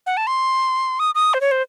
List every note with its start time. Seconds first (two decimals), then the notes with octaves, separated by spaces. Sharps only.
0.07 F#5
0.17 A5
0.27 C6
1.00 D#6
1.15 D#6
1.34 C5
1.41 C#5
1.51 C5